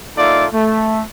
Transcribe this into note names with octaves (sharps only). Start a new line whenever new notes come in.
A#3 D#4 F4 A4 D5 E5
A3